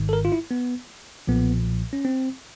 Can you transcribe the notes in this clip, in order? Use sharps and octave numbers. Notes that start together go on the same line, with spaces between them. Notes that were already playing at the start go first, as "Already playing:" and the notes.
Already playing: G#1 G#2 D#3
A4
A#4
F4
E4
B3
B1 A#2 F3 B3
C#4
C4